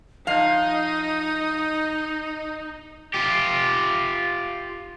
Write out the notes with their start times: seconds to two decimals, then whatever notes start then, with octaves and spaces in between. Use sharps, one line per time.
0.27 F3 D#4 D#5 F5
3.14 F4 G4